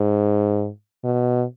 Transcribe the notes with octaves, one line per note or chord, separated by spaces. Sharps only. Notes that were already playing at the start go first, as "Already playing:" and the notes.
Already playing: G#2
B2